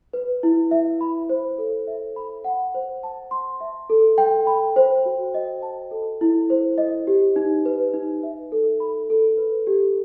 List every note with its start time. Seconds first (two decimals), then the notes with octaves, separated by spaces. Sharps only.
0.13 B4
0.43 E4
0.71 E5
1.01 B5
1.29 C5
1.58 A4
1.87 E5
2.16 B5
2.44 F#5
2.75 C5
3.03 A5
3.31 C6
3.61 E5
3.90 A4
4.18 G5
4.47 B5
4.76 C5
5.06 F#4
5.34 D#5
5.62 A5
5.91 A4
6.21 E4
6.50 C5
6.78 D#5
7.07 G4
7.36 D#4
7.66 B4
7.94 D#4
8.23 E5
8.52 A4
8.80 B5
9.10 A4
9.38 B4
9.67 G4